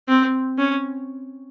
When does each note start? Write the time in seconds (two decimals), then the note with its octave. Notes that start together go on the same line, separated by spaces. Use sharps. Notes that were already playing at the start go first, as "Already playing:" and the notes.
0.08 C4
0.58 C#4